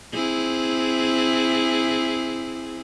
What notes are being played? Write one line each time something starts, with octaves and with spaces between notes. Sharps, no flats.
C4 E4 G#4